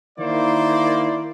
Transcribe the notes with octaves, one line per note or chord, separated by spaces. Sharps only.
D#3 A#3 E4 C5 D5